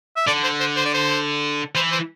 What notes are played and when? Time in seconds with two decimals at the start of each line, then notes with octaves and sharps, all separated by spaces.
0.17 E5
0.27 D3 D5
0.43 C5
0.60 C5
0.76 C5
0.85 D5
0.94 C5
1.75 E3 C5
1.92 C5